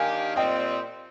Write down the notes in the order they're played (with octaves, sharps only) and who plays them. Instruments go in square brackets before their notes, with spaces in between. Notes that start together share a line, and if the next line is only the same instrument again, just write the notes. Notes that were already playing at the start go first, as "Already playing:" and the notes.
Already playing: [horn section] D#3 A#3 D4 G4 [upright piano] F5 G#5
[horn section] A#2 G3 C4 [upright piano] D#5 G5